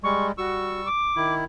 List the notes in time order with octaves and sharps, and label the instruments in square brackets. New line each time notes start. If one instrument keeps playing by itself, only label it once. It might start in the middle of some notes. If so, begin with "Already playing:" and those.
[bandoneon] G3 G#3 [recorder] C#6
[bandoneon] G3 C#6 E6 [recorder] F#4
[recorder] D6
[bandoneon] D#3 E4